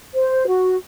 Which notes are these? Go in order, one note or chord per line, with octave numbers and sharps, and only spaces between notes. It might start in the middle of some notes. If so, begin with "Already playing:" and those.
C5
F#4